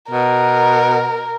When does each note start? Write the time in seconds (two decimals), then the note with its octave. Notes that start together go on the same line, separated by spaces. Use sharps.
0.11 B2 A#4